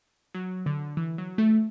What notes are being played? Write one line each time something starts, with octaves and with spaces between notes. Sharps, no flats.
F#3
D3
E3
F#3
A3